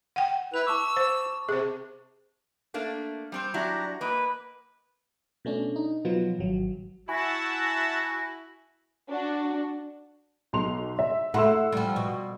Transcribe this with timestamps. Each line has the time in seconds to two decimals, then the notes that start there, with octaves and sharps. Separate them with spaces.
0.16 F#5 G5
0.54 E4 B4 F7
0.67 A5 C#6 D6 E6
0.97 C5
1.49 C3 G#4 C5
2.74 A3 A#3 D4
3.32 G3 C4 C5
3.54 F#3 D4 E4 F#4 G4 A#5
4.01 A#3 B4 D#5
5.45 B2 A3 C#4 D4
5.76 D#4
6.05 B2 F3 F#3 B3 F4
6.39 G#1 F#3
7.09 E4 F#4 E5 F#5 G#5 A5 B5 C#6
9.09 D4 F#4
10.53 B1 C6 F7
10.99 E5
11.34 A3 E4 F#5 C6 E6
11.72 F3 G3
11.96 B2